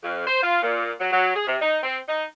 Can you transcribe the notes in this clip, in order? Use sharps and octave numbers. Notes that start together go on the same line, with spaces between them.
F2
C5
F4
A#2
F#3
F#3
G#4
C3
D#4
C4
D#4